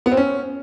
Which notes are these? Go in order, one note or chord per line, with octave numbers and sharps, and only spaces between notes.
B3
C4
C#4